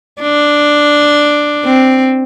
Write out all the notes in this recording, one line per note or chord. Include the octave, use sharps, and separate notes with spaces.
D4
C4